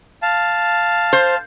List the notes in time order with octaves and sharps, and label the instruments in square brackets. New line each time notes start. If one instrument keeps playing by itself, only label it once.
[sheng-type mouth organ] F5 A5
[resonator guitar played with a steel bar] C5